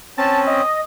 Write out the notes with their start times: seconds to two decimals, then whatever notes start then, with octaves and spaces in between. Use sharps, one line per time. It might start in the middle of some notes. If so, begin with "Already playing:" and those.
0.18 C4 C#4 A5
0.47 D#5